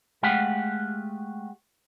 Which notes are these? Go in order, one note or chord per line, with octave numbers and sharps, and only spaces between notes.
G#3 A3 G4 F5 F#5